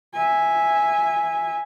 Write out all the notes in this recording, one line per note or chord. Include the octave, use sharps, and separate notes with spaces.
E5 G#5